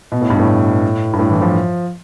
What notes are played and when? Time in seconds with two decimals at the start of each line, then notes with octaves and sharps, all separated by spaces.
0.12 B2
0.21 A2
0.30 G2
0.40 A2
1.13 G2
1.19 A2
1.30 E3
1.42 F3